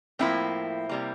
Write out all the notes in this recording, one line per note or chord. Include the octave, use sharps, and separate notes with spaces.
A2 F3 A#3 C4 E4
C3 G3 A#3